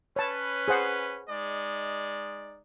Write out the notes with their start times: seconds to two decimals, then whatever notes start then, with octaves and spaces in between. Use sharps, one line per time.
0.16 C#4 B4 C#5 A5
0.68 G#4 C5 F#5
1.29 G#3 D#4 D5